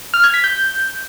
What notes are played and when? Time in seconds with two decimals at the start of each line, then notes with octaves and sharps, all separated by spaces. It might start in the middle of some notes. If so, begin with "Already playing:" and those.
0.14 F6
0.24 G#6
0.34 B6
0.44 G6